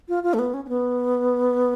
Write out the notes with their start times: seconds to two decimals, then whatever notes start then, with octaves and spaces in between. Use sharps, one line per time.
0.09 F4
0.23 F4
0.34 A3
0.39 B3
0.54 C#4
0.65 C#4
0.69 B3